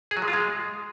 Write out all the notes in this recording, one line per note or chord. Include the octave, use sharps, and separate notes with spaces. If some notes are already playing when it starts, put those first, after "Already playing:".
G#4
F#3
G#3
F4
G#3